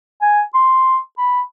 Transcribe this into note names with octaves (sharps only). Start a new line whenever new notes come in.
G#5
C6
B5